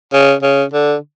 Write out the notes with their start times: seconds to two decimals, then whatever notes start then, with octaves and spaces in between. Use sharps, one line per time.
0.13 C#3
0.42 C#3
0.73 D3